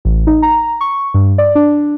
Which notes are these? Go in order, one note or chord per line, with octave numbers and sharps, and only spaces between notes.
A1
D#4
A#5
C#6
G2
D5
D4